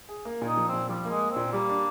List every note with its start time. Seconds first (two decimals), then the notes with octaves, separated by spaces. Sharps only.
0.09 G#4
0.25 A#3
0.42 A#2
0.47 D#4
0.57 F3
0.68 A#2 C4
0.89 F3 G3
1.05 A#3
1.10 G#3
1.21 A#3
1.31 C4
1.36 A#2
1.52 G3 A#3
1.69 D4